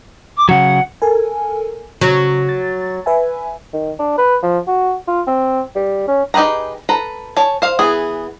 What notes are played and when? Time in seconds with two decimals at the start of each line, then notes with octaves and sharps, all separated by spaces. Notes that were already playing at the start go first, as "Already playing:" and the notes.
0.37 D6
0.49 C#3 F#3 F#5
1.02 A4 A#4 G#5
2.01 C#3 F#3
2.49 A6
3.06 B4 E5 G#5
3.73 D#3
3.99 D4
4.18 B4
4.43 F3
4.67 F#4
5.08 F4
5.27 C4
5.76 G3
6.08 C#4
6.34 D#4 G4 G#4 B4 A#5
6.89 A4 B4 A#5
7.37 C#5 G#5 A5
7.62 C5 F5
7.79 E3 B3 G#4